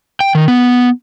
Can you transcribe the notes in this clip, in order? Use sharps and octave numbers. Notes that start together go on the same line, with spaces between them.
G5
D#3
B3